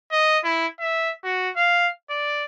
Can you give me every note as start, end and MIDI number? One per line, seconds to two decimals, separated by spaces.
0.12 0.38 75
0.44 0.67 64
0.80 1.12 76
1.24 1.49 66
1.56 1.89 77
2.10 2.46 74